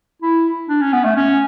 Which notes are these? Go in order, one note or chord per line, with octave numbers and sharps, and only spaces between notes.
E4
D4
C#4
B3
A3
C#4